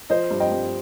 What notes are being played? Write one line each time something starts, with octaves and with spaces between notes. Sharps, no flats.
F3 C5 D#5
G2
D#5 G5
G2